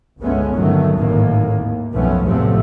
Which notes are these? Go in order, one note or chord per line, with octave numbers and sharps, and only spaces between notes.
G1 C#2 G#3 A3 B3 C#4
G1 A#2 D#3 F#3 A3
G#1 D#2 A2 D#3 A#3
D#2
B1 F#2 F3 A3 B3 C#4
A1 E2 A2 C3 F3 A3